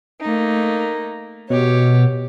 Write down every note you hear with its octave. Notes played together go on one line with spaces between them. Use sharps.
A3 A#3 D#4
B2 G4 C#5